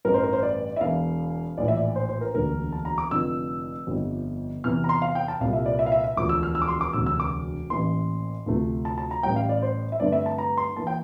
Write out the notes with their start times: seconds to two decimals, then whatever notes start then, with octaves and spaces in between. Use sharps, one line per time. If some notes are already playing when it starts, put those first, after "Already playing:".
0.05 A1 G2 E3 A3 A#4
0.14 C5
0.24 A#4
0.33 C5
0.43 D5
0.76 E5
0.80 E1 E2 E3 F5
1.58 A#1 A2 E3 D5
1.68 E5
1.77 D5
1.96 C5
2.09 C5
2.21 A#4
2.34 E1 D2 D3 G3 A#3 A#4
2.72 A5
2.85 A#5
2.98 D6
3.11 F1 F2 D3 F3 E6
3.87 G1 F2 D3 G3
4.64 E2 C3 E3 F6
4.84 A#5
4.89 C6
5.02 F5
5.15 G5
5.28 A5
5.41 C2 A#2 G3 F5
5.53 E5
5.66 D5
5.79 E5
5.86 F5
5.92 E5
6.04 E5
6.17 E1 D2 D3 F3 D6
6.29 E6
6.43 F6
6.55 E6
6.62 D6
6.68 C6
6.81 D6
6.93 E1 D2 C3 E6
7.06 E6
7.20 D6
7.70 A1 A2 E3 A#3 C6
8.46 D2 C3 F3 A3
8.85 A5
8.98 A5
9.11 A#5
9.23 A1 A2 G3 G5
9.36 F5
9.49 D5
9.62 C5
9.92 E5
10.00 G2 D3 A3 C4 D5
10.12 E5
10.26 A5
10.38 A#5
10.57 C6
10.76 E3 A#3 A5
10.87 G5